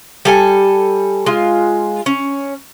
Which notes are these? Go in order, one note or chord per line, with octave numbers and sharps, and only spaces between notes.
G3 A4 G#5
G#3 F4
C#4